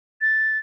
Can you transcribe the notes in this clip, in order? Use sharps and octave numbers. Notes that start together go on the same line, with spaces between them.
A6